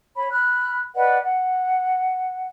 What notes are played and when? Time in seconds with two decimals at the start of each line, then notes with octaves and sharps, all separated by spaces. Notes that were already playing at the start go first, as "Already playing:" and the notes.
0.16 C#5 B5
0.31 B5 F6 F#6
0.95 B4 D5 D#5 F#5
1.23 F#5